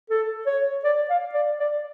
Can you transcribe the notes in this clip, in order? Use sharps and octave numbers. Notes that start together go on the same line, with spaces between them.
A4
C#5
D5
F5
D5
D5